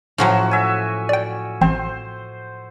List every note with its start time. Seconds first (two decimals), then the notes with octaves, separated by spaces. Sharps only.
0.18 A2 F3 F#3 C#4 F#4
0.51 E5 G#5
1.09 D5 G5
1.61 A1 C4 C5